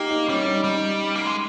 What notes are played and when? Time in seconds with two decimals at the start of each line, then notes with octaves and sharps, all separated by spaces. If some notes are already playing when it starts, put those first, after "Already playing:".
Already playing: A#3 D#4 G4
0.11 D#4
0.29 G3 C#4
0.47 D#4
0.64 G3 D#4
1.16 A#3
1.26 G#3